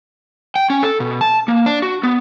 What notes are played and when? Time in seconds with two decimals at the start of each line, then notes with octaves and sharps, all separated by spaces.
0.56 G5
0.70 C#4
0.83 A4
1.00 B2
1.21 A5
1.48 A#3
1.66 D4
1.82 F#4
2.03 B3